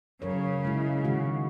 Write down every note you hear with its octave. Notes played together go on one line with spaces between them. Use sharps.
C#3 F#3 A#4 C#5
G#3 E4
D#3 G#3 F#4